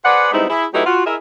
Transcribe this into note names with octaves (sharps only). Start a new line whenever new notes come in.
G#4 B4 C5 D5 F#5
G3 G#3 B3 C4 D#4 E4
E4 G#4
F#3 A3 D#4 E4 G4 B4
F4 F#4
E4 G#4 A#4 D#5 E5